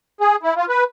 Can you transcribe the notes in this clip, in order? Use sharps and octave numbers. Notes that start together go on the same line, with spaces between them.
G#4
E4
F4
B4